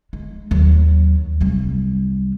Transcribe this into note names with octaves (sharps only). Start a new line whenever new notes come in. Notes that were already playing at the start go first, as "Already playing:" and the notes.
G#3
D#2 F#3
C2 G3